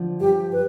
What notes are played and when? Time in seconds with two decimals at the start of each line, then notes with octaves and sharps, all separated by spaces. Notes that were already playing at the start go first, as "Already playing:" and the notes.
Already playing: D3 F3
0.19 G2 G4
0.52 B4